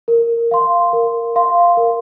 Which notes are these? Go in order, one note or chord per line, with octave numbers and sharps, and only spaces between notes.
A#4
F5 C6
A#4
F5 C6
A#4